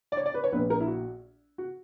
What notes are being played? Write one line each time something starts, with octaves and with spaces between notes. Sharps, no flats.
D5
C#5
D5
B4
C#5
A#1 A#2 A#3 B4
A#4
E4
F#4
F#4